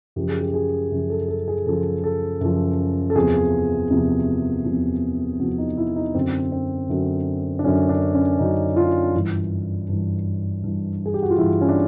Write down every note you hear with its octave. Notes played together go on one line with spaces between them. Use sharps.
F#2 C#3 F3 G4
G#4
G4
G#4
F#2 C#3 F3
A4
A4
G#4
F#2 C#3 F3 A4
A4
F#2 C#3 F3
A4
E2 C3 F3 G#4
E2 C3 F3
E2 C3 F3
E2 C3 F3 F#4
D#4
E4
D#4
F#2 D3 F#3 C4
C4
F#2 D3 F#3
D4
F#2 D3 F#3 C#4
D4
C#4
F#2 D3 F#3 D#4
F4
G2 E3 E4
G2 E3
G2 E3
G#4
G4
F#4
F4
G2 E3 E4
C#4
D4